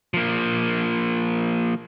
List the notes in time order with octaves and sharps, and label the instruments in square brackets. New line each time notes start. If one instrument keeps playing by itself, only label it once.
[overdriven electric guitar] F3 A#3